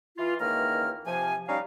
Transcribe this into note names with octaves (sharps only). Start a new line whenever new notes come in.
E3 F4
C#2 D#3 E3 A#3 A#5 F6
C3 F3 G#5
G3 C#4 D#4 F5